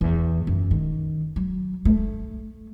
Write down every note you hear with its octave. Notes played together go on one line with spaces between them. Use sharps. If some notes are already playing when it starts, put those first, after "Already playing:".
E2
F#2
D#3
F#3
A3